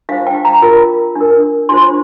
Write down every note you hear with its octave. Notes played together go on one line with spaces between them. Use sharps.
D4 F4 C5 F5
G5
A#5
F4 A#4
D4 A#4
D4 F4 C5 C6